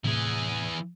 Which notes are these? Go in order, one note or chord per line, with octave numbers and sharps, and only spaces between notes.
A2 C3 E3 G#4